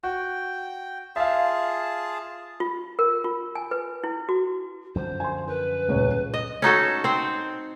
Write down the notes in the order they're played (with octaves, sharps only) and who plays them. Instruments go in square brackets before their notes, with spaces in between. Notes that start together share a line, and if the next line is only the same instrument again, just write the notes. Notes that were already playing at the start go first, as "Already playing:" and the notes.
[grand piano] F#4 [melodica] G5
[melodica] F4 G#4 A5 [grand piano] E5 F5
[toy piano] F4
A#4
F4
G#5
B4
E4
F#4
[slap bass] F#2 D3 F3 [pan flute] C5
[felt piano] G#5 C6
[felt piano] A#4 [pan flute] B4
[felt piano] D#1 C#2 C#5
[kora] D#5
C#4 D#4 F#4 A4
C4 C5